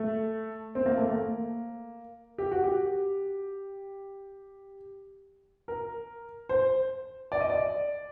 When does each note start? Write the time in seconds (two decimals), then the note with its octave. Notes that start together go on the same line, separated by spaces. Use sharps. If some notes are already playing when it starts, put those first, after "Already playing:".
Already playing: A3
0.75 C4
0.86 A#3
0.98 A3
1.08 A#3
2.38 G4
2.52 F#4
2.64 G4
5.68 A#4
6.49 C5
7.32 D5
7.41 D#5
7.50 D5